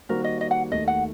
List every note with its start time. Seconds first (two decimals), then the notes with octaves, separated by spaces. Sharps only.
0.09 D#3 G3 A#3 F#4 A#4 C5
0.24 D#5
0.41 D#5
0.51 F#5
0.71 D#2 D#3 A3 D#5
0.88 F#5